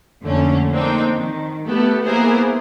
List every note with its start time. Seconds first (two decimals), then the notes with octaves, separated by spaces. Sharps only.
0.23 F2 A#2 D3 A3 C#4
0.72 A#3 C4 D4 D#4 G5
1.13 D#3
1.65 A3 B3 G4 A4
2.04 A#3 B3 E4 G#4 A#4 C5